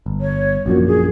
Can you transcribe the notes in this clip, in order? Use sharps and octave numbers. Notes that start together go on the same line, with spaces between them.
G1
C#5
A#1 F#2 A#2 F#4
G#4